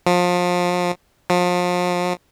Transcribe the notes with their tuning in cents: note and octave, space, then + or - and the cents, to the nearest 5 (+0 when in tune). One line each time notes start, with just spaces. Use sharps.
F3 +30
F3 +35